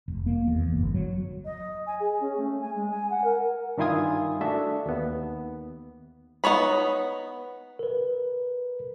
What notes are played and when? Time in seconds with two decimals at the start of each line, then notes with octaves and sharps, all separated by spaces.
0.08 F1
0.26 A#3
0.47 E2
0.67 F1
0.79 G1
0.94 F#3
1.44 D#5
1.86 G#5
1.99 G#4
2.20 C#4
2.36 A3
2.60 G#5
2.74 G#3
2.89 G#5
3.10 F#5
3.23 A#4
3.78 G2 D#3 E4 F4 G#5 D#6
4.41 A3 D4 F#4 A4 E5
4.86 D#2 B3
6.44 B3 D#4 C#5 B5
7.79 A#4 B4